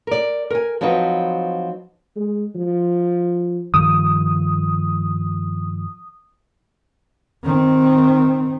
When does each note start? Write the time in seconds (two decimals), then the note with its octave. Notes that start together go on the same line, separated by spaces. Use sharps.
0.07 A#4 D5
0.50 A#4 G#5
0.81 F3 F#3 C4 D#4 B4 D#5
2.16 G#3
2.56 F3
3.74 G2 D#3 F3 D#6
7.43 D#3 C4